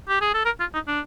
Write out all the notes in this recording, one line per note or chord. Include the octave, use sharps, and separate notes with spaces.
G4
G#4
A4
A#4
F4
D#4
D4